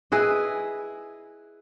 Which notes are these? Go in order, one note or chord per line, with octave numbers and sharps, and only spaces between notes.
E4 G#4 B4 D#5